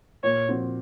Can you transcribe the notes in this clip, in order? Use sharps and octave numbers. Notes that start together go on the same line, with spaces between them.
A#2 C#5
F3 C4 F#4